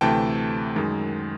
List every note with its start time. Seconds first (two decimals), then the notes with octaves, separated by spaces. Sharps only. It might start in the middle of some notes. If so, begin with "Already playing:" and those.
0.01 D2 C3 E3 A3 G5 A5
0.76 F#2 D#3 G#3